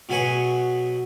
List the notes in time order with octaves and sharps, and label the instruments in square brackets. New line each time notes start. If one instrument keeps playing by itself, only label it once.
[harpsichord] B2 F#3 G#4 G#5 B5 C#6